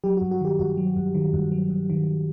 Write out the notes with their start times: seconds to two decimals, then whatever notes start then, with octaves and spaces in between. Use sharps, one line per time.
0.04 F#3 G4
0.17 G2 F#4
0.31 F#4
0.41 D#3 G4
0.59 G2 F#4
0.77 F#3
0.96 G2
1.15 D#3
1.33 G2
1.51 F#3
1.70 G2
1.90 D#3